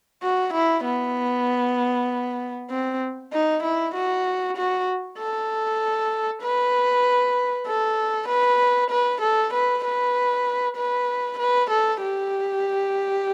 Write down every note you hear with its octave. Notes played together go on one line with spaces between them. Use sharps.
F#4
E4
B3
C4
D#4
E4
F#4
F#4
A4
B4
A4
B4
B4
A4
B4
B4
B4
B4
A4
G4